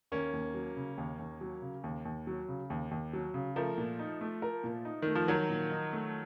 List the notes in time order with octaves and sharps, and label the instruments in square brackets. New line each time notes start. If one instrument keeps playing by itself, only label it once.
[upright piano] D#2 [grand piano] A#3 C#4
[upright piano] D#2
F#3
C#3
D#2
D#2
F#3
C#3
D#2
D#2
F#3
C#3
D#2
D#2
F#3
C#3
[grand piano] F3 A3 [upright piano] A#4
[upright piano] A#2
D#4
A3
A#4
A#2
D#4
[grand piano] D#3 [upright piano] A3
[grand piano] F3
[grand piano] D#3 F#3 [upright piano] A#4
[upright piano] A#2
D#4
A3